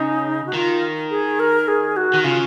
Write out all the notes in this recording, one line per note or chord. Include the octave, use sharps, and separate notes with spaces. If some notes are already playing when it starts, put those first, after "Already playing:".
Already playing: C#3 D#4
F#4
D#3 F4
G#4
A#4
G#4
F#4
D#3
C#3 F4